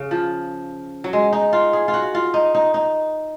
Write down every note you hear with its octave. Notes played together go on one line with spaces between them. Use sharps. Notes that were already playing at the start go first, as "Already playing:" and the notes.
Already playing: C#3
F3
F#3
G#3
D#4
F4
G#4
F4
F#4
F4
D#4
D#4
D#4